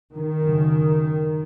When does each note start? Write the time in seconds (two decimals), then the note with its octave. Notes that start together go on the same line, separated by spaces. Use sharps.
0.15 D#3
0.44 F#2 C#3